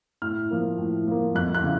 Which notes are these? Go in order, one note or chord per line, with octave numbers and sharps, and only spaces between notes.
A2 F6
F3 A#3
A2
F3 A#3
F2 F#6
F#6
C#3